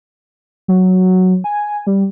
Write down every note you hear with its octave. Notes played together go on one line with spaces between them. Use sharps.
F#3
G#5
G3